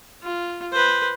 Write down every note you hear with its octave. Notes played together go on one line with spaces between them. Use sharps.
F4
B4 C5